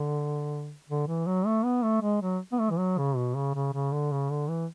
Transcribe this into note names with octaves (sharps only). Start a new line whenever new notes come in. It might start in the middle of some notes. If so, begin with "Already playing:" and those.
Already playing: D3
D3
E3
F#3
A3
B3
A3
G#3
F#3
B3
A3
E3
F#3
C#3
B2
C#3
C#3
C#3
D3
C#3
D3
E3